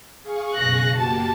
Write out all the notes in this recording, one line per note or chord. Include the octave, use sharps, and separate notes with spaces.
G#4 F5 C#6
F#1 B2 F#6 A#6
A#3 F#4 G4 A5